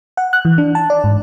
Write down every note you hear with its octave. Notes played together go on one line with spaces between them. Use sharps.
F#5
F#6
E3
D4
A5
D5
G#2